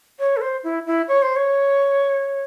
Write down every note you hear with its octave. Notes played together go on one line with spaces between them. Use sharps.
C#5
A4
C5
E4
E4
C#5
C5
C#5